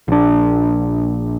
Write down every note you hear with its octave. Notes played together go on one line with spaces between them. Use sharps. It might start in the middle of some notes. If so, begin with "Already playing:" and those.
A#1 D4